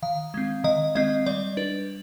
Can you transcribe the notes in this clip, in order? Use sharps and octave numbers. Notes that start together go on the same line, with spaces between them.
D#3 F5
G#3 C4
D#3 D#5
G#3 C4 D#5
G3 D5
D4 B4